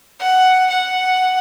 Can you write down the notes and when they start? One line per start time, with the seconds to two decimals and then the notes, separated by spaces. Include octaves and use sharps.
0.20 F#5
0.70 F#5